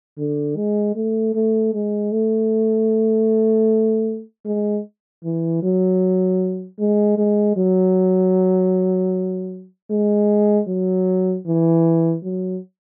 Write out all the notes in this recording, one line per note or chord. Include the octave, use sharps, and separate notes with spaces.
D3
G#3
A3
A3
G#3
A3
G#3
E3
F#3
G#3
G#3
F#3
G#3
F#3
E3
F#3